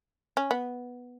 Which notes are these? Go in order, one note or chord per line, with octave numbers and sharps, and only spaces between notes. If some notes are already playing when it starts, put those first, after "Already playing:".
C#4
B3